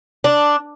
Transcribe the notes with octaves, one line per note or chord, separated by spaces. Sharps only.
D4